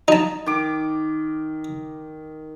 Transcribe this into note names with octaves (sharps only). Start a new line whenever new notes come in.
D#4 A5
D#3 D6